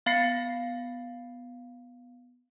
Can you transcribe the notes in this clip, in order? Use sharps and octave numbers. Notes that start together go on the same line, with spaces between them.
B3 F5 B5 A6 C7 C#7